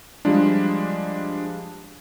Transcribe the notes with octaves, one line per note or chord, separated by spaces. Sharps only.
F3 G3 G#3 D4